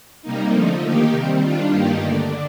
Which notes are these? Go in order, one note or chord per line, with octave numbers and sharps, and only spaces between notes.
C3 G3 A#3 D#4
D3 F3 A3 D#4
D#3 A#3 D#4 G4
C3 D#3 G3 C4
D#3 G3 D4 F4
G2 D#3 A#3 D#4 G4
D3 A3 D4